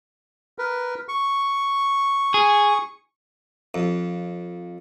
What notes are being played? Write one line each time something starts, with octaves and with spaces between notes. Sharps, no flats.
A#4 B4
C#6
G#4
F2